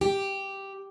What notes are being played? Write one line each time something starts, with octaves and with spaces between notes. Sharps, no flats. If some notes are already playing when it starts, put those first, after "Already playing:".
G4